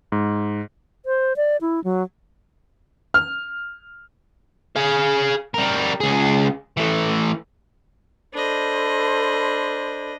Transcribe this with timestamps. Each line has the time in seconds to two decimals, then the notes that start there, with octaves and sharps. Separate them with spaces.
0.12 G#2
1.06 C5
1.36 D5
1.61 E4
1.84 F#3
3.14 F6
4.76 G#4 F5
5.54 G3 A#4
6.00 C#2 G#4
6.77 E3 A3
8.33 D4 A4 C5 D#5 B5